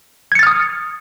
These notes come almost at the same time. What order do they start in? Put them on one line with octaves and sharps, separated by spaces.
G#6 C#7 A6 F6 D#6